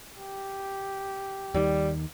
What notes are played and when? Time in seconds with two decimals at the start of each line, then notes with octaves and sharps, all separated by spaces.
0.15 G4
1.54 D#2 D#3 G3